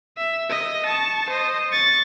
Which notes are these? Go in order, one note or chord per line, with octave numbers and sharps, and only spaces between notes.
E5
D#5
A5 C#6
C5 D#5
C#6 A6